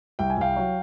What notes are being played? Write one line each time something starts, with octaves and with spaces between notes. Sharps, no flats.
C2 G5
G#5
C2 F5 G5
F#3